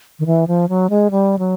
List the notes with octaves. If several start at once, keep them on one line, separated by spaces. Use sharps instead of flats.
D#3
E3
F3
F#3
G#3
G3
F#3